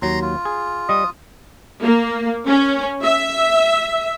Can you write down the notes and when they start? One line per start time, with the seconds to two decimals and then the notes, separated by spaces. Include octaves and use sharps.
0.02 D#2 F#3 A#5 C6
0.22 F4
0.45 G#4
0.89 G3 D#5 D#6
1.83 A#3
2.48 C#4
3.03 E5